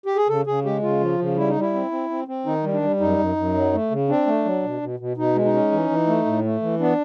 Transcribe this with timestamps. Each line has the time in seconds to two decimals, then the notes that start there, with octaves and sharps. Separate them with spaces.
0.06 G4
0.16 G#4
0.29 C#3 A4
0.47 C#3 G#4
0.65 G#3 G4
0.82 C#3 F4
1.01 F3
1.20 C#3
1.37 G3 E4
1.48 D#4
1.55 G3
1.61 E4
1.74 C4
1.91 C4
2.10 C4
2.28 C4
2.46 D#3 D#4
2.64 G3
2.73 D4
2.82 G3
3.00 F#2 D#4
3.19 F#2
3.36 F#2
3.55 F#3
3.73 A3
3.91 C#3
4.09 C4 D4
4.27 A3
4.45 F#3
4.63 B2
4.82 B2
5.00 B2
5.17 B2 D#4
5.35 G#3
5.45 D#4
5.53 C#4
5.72 E3
5.90 E3
6.07 A3
6.26 A2
6.44 A3
6.62 E3
6.79 B3 D4